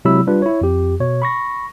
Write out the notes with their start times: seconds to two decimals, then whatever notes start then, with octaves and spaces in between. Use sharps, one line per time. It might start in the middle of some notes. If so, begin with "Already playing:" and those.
0.05 C3 F#3 G#3 E4 B5 E6
0.27 G3 D4 F4 B4
0.42 E4 C#5
0.61 F2 G4
1.00 B2 C#5
1.22 B5 C#6 A#6